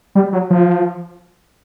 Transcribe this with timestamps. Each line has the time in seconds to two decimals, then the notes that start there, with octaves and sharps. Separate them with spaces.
0.15 G3
0.33 F#3
0.50 F3